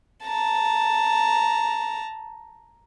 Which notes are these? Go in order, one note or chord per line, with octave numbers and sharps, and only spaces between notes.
A5 A#5